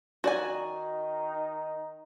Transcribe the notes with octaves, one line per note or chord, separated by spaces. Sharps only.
D#3 D#4 F#4 D5 G#5